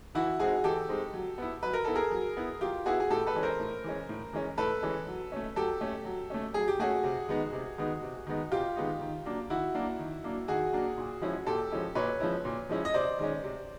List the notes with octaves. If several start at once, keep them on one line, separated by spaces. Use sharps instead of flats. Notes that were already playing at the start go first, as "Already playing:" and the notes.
E3 E4 F#4
G#3 C4 D#4 F#4 G#4
E3 G4 A4
G#3 C4 D#4
F#3
B3 E4
F#3 B4
A#4
B3 E4 A4
G#4 A#4
F#3
B3 E4
F#3 F4 G4
B3 E4 F#4 G#4
G#4
A2 G4 A4
A4 B4
E3 G#3 C#4
A#4 C5
A2
E3 G#3 C#4
A2
E3 G#3 C#4
A2 A4 B4
E3 G#3 C#4
F#3
A3 C#4
F#3 G4 A4
A3 C#4
F#3
A3 C#4
F#3 G#4
G4
A3 C#4 F#4 G#4
C3
D#3 G#3 B3 D#4
C3
D#3 G#3 B3 D#4
C3
D#3 G#3 B3 D#4
C3 F4 G4
D#3 G#3 B3 D#4
D#3
F#3 A#3 D4
D#3 E4 F#4
F#3 A#3 D4
D#3
F#3 A#3 D4
D#3 F#4 G#4
F#3 A#3 D4
A#2
F3 G#3 C#4 E4
A#2 G4 A4
F3 G#3 C#4 E4
A#2 B4 C#5
F3 G#3 C#4 E4
A#2
F3 G#3 C#4 E4
D#5
C3 C5 D5
D#3 G#3 C#4
C3